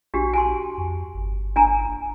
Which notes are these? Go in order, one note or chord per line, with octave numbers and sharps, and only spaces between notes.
A#1 D4 F#4 G4
G#5 A5 C6
F2
G1
D4 G#5 A#5
F1